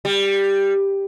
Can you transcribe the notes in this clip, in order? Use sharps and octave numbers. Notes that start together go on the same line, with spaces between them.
G3